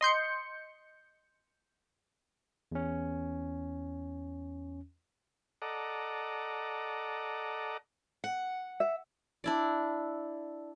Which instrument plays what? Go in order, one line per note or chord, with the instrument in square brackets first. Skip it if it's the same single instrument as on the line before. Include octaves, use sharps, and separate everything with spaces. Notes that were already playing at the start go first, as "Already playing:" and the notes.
[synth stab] D#5 C6 G6 C#7
[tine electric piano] E2 C#4
[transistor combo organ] A4 D5 D#5 F#5 A#5
[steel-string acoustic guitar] F#5
[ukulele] E5
[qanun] D4 E4 D5